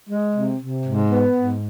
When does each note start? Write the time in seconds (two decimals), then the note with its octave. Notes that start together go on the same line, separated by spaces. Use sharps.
0.09 G#3
0.35 C3
0.60 C3
0.85 G#2
1.10 B3
1.35 G#2